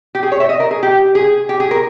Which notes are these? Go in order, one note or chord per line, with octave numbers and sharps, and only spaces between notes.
G4
G#4
C#5
E5
D#5
A#4
G#4
G4
G#4
G4
G#4
A#4